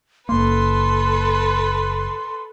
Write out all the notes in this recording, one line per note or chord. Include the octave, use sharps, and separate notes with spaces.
F#1 A#3 A4 B4 C6